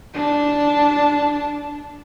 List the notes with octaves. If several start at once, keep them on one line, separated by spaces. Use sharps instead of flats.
D4 A5